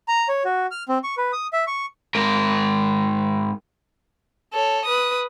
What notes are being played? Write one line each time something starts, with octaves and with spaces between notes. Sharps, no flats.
A#5
C#5
F#4
F6
C4
C#6
B4
D#6
E5
C#6
G#2 A#4
A4 C#5
B4 D#6